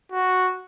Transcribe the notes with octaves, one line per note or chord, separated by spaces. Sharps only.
F#4